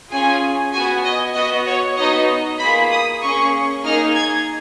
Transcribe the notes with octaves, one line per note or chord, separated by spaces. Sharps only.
C#4 F4 G#4 G#5
B3 F#4 G#5
D#5
B3 F#4 D#5
C#5
B3 D#4 F#4 D#5
A#3 F4 G#4 B5
D#6
A#3 C#4 G#4 C#6
A#3 D#4 G#4 F6
G#6